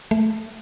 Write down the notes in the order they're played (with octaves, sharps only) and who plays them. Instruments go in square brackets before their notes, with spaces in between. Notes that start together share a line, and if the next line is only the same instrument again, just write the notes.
[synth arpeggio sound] A3